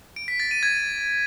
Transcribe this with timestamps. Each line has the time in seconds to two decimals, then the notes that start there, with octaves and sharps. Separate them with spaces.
0.16 D7
0.28 B6
0.40 A6
0.51 D#7
0.63 G#6